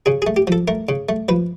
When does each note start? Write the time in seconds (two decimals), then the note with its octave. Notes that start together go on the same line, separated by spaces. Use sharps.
0.06 C#3 G#4
0.22 G#4
0.27 A3
0.37 G4
0.47 F3 A4
0.68 A3 A#4
0.89 C#3
1.09 A3
1.29 F3 B4